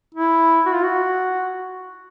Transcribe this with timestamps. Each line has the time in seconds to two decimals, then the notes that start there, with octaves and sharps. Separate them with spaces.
0.15 E4
0.66 F#4
0.74 F4
0.83 F#4